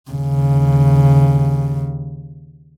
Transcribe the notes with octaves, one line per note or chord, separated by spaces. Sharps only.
D#2 C#3